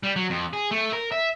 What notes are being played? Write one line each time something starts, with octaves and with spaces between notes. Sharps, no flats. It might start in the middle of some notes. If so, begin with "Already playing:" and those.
G3
F#3
F2
G#4
A3
A#4
E5